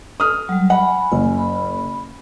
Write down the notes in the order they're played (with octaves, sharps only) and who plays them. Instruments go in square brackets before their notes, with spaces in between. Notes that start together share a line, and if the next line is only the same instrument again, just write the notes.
[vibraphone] A4 [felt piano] D#6 F6
[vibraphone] F#3 G3
[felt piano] F#5 [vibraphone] G#5 B5
[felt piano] F#1 [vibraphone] G#5
[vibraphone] B5